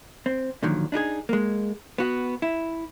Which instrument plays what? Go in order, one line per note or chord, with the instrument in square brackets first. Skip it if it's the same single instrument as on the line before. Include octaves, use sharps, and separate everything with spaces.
[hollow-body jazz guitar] C4
A#2 D3 D#3 F3 F#3
D4 D#4 G4 G#4
G#3 A#3
B3 F#4
E4